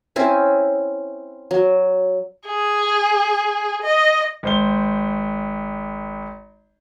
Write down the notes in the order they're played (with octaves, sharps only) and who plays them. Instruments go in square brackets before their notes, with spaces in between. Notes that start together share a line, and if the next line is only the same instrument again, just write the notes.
[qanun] C4 C#4 E4
F#3
[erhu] G#4
D#5
[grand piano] G#1 C5 G7